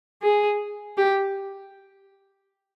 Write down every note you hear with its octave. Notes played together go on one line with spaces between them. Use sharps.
G#4
G4